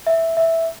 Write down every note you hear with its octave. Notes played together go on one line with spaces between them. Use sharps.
E5
E5